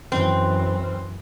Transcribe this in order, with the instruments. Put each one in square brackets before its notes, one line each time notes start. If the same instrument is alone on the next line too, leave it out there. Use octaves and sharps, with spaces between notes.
[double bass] F#2 E3 [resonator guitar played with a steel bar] C4